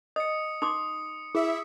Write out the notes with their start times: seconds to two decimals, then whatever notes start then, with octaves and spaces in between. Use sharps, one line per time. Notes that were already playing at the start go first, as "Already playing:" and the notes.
0.16 D#5 D#6 C#7
0.62 D#4 C6 D6 D#6
1.35 E4 G#4 E5